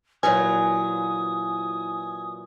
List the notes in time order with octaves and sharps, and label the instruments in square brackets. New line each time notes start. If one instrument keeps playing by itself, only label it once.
[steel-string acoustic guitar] A#2 E3 F#3 [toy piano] B4 C#5 [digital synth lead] G#5 [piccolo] D#6